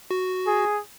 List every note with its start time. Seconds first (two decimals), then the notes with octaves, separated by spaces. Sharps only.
0.11 F#4
0.47 G#4